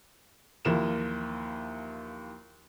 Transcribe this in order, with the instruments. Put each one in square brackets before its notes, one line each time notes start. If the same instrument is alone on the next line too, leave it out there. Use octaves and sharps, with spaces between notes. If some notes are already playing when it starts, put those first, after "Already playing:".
[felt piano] D#2 E3 F3 A#4 E7